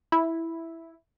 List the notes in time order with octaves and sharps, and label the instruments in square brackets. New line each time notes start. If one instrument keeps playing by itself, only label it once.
[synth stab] E4